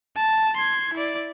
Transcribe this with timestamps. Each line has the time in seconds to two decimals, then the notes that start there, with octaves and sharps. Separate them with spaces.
0.17 A5
0.57 C6 G#6
0.94 E4 D5